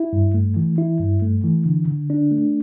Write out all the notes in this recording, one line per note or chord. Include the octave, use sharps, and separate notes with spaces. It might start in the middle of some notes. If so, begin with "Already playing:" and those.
Already playing: E4
G2
A3
E3
E4
G2
A3
E3
D3
D3
D4
A3